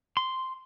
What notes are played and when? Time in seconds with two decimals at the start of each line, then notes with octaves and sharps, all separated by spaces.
0.17 C6